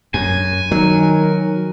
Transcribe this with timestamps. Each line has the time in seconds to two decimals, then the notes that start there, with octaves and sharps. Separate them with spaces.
0.14 F#2 G#5
0.72 D#3 F#3 A#4